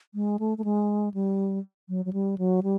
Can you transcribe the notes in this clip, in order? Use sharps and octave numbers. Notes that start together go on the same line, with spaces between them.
G#3
A3
A3
G#3
G3
F#3
F#3
G3
F#3
G3